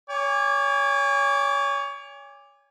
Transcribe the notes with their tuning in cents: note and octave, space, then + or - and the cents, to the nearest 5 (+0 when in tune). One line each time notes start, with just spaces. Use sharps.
C#5 +25 G#5 -30 D6 +0